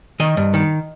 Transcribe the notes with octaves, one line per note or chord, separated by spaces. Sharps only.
D#3 D#5
G2
D#3